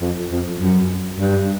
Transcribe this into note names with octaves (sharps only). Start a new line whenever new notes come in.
F2
F2
F#2
G2